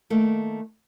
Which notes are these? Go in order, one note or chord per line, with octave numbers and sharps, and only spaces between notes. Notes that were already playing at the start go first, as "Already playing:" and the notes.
D#3 A3 A#3